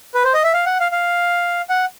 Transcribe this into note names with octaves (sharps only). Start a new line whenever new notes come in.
B4
C5
D#5
E5
F5
F#5
F5
F5
F#5